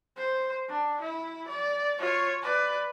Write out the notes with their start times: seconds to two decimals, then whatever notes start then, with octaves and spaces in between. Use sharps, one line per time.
0.16 C5
0.68 D4
1.01 E4
1.48 D5
1.99 F4 C#5
2.43 B4 D5